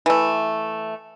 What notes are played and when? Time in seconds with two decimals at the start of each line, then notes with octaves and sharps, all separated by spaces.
0.06 E3 A3